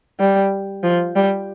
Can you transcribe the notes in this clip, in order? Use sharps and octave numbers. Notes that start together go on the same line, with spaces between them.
G3
F3
G3